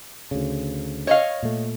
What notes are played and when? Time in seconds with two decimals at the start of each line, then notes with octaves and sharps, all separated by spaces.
0.31 D2 C#3
1.07 C#5 D#5 F5
1.43 A#2 A3